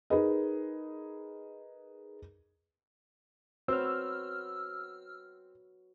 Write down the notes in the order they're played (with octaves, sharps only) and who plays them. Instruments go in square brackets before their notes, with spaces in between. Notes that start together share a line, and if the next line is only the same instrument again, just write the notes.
[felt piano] D#4 G#4 A#4 B4 D#5
[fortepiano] C4 [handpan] F#4 B4 C#5 [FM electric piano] E6 F6